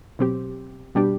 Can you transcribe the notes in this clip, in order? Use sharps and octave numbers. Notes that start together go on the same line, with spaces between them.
B2 F#3 C4 G4
B2 G3 D4 G4